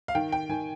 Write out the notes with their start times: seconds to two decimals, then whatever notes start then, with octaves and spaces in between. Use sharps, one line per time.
0.08 F5
0.15 D#3 G5
0.32 G5
0.49 D#3 G#5